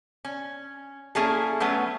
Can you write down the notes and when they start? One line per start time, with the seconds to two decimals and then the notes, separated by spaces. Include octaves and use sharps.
0.25 C#4
1.15 A#3 C#4 E4 G#4 A4
1.60 F#3 A3 B3 C#4